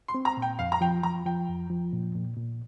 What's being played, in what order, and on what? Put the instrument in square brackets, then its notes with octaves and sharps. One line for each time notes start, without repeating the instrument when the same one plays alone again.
[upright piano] C6
[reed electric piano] C4
[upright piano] A#5
[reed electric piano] A#2
[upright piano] G5
[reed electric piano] F2 [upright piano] F5
[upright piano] A#5
[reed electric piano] F3 [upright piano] G5
[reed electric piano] F3 [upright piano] A#5
[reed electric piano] F3 [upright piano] G5
[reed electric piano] F2
F3
A#2
A#2
A#2